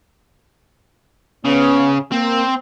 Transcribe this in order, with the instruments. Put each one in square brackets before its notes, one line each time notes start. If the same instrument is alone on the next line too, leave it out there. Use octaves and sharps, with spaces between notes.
[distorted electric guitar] C#3 [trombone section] B3 C#4
[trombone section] A#3 [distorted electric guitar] C4